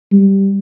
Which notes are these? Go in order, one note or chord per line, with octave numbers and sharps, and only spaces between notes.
G3